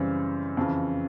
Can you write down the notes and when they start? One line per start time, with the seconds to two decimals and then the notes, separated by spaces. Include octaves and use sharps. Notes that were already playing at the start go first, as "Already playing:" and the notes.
Already playing: F#2 C#3 E3 G3 C4
0.57 F2 C#3 E3